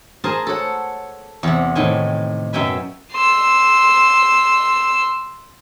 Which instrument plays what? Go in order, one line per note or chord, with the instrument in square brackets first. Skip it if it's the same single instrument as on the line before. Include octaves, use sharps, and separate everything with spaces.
[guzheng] G#4 A#4 C5 G#5 A5
A4 C#5 F#5
E2 C3
A2 C3 D#3 G5 G#5
F#2 B2 E5 G5 G#5 B5
[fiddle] C6 E6